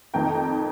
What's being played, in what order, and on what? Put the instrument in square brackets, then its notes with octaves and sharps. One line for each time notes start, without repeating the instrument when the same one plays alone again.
[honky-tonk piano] F2 D#3 A3 G5 A#5